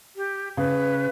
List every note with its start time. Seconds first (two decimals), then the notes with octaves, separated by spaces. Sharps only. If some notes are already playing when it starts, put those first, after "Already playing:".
0.16 G4
0.57 C#3 B4